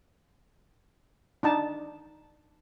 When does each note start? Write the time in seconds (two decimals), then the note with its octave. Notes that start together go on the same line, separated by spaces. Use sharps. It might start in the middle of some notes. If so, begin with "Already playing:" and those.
1.43 D4 D#4 A5